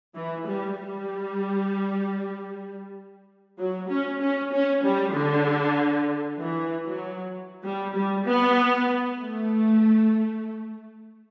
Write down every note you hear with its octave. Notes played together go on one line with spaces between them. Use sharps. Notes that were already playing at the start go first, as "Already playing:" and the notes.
E3
G3
G3
F#3
C#4
C#4
C#4
G3
D3
E3
F#3
G3
G3
B3
A3